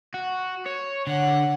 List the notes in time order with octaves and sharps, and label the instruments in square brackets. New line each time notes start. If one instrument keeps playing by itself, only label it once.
[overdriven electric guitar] F#4
C#5
[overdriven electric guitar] D3 [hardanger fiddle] C#5 F#5